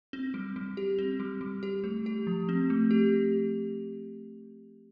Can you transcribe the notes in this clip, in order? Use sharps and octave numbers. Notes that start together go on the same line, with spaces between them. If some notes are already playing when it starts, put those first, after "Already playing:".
C4
G3
G3
G4
C4
G3
G3
G4
A3
G4
F3
C4
A3
G4